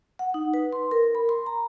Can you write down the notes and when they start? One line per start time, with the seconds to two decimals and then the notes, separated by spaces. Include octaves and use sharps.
0.19 F#5
0.34 D#4
0.54 B4
0.73 C6
0.91 A#4
1.15 B5
1.29 C6
1.46 A#5